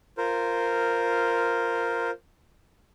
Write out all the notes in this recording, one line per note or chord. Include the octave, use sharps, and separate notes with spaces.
F4 A#4 C5